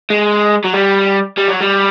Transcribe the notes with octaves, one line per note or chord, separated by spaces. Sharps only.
G#3
F#3
G3
G3
F#3
G3